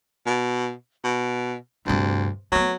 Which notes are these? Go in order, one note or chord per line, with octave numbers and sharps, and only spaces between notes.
B2
B2
D2 G2 C3
F#3 A3 B3